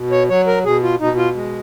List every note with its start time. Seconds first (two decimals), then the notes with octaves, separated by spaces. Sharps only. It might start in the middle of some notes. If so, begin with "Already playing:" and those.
Already playing: B2
0.11 C#5
0.29 F#3 C#5
0.47 A#4
0.65 B2 G#4
0.83 F4
1.00 B2 D#4
1.17 F4
1.35 G#3